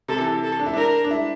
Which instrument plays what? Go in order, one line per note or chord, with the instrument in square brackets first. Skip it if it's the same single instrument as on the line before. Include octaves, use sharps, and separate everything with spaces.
[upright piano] C3 [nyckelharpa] A4
[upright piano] E3
[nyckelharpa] A4
[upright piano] D4
E4
[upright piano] D4 [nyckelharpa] A#4
[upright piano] D4
E4